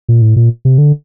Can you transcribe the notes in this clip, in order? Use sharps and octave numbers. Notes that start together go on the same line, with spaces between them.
A#2
A2
A#2
C3
D3